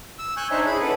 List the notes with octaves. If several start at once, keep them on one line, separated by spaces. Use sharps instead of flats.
E6
G#5 C#6 F#6 G6
D4 D#4 C5 C#5 E5 G#5
E4 G#4 B5
C#4 A4 B4 F#5